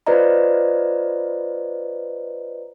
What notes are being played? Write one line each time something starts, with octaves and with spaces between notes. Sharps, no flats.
F4 B4 C5 D5 D#5 A#5